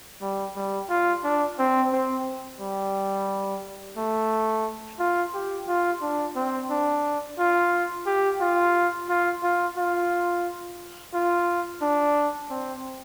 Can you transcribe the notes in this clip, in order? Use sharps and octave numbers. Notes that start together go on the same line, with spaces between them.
G3
G3
F4
D4
C4
C4
G3
A3
F4
G4
F4
D4
C4
D4
F4
G4
F4
F4
F4
F4
F4
D4
C4